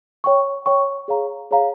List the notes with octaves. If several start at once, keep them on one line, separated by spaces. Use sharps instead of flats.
C#5 G5 C#6
C#5 G5 C#6
G#4 C#5 F5 A#5
G#4 C#5 F5 A#5